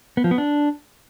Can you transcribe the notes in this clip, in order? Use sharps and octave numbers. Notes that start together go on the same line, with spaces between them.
B3
F3
B3
D4